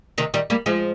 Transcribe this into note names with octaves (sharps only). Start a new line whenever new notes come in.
C3 D#3
D#3 G3
G3 A#3
F3 G#3